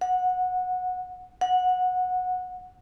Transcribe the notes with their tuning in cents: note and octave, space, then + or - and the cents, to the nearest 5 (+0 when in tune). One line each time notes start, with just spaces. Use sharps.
F#5 -15
F#5 -15